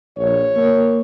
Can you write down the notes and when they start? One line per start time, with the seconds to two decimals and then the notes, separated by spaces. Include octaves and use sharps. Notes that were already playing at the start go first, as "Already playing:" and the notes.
0.17 A#1 C#5
0.57 A#3